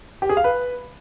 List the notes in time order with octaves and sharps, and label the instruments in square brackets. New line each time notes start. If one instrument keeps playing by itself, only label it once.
[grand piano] G4
G#4
F5
B4